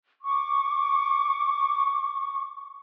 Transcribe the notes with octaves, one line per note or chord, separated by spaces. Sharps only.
C#6 D6